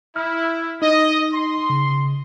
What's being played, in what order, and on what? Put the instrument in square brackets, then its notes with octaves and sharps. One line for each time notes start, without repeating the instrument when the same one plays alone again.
[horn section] E4 [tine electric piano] F6
[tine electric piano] D#4 [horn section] D#5
[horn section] C6
[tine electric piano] C#3